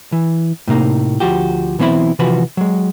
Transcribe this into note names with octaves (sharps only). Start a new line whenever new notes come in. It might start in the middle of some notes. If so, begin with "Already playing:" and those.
E3
A2 C3 A#3 D#4
D2 F3 F#4 G4
B1 E3 B3 C4 E4 B5
C3 E3 F3 F#4 B4
F#3 G#3